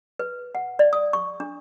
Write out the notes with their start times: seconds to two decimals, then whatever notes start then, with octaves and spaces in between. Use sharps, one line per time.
0.19 B4
0.55 F#5
0.79 D5
0.93 D#6
1.13 C#6
1.40 D4